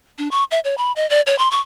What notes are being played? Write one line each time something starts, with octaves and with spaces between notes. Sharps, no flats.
D4
C#6
E5
C#5
B5
D#5
D5
C#5
C6
C#6